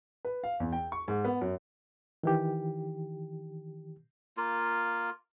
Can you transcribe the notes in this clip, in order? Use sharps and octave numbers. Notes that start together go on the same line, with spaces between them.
B4
F5
E2
G5
C#6
G#2
B3
F#2
D#3 E3 G4
A#3 F4